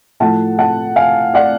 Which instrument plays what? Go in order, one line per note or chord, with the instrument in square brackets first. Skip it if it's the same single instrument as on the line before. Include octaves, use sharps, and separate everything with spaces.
[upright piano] A2 F3 A3 F#5 A5
F#5 A5
F5 G#5
D5 F#5